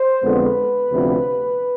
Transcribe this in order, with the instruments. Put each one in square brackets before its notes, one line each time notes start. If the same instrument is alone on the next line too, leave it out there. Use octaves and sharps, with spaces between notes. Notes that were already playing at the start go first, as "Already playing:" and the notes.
Already playing: [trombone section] C5
F2 D3 G#3 B3 B4
D2 C3 F3 B3